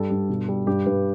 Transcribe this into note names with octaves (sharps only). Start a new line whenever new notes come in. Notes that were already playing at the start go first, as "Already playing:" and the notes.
Already playing: G2 G3 A4
G2
B2
G3
G2 G4
G2 B4